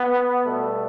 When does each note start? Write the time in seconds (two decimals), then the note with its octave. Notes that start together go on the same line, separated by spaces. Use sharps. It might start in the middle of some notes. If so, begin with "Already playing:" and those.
Already playing: B3
0.45 B2 G3 A3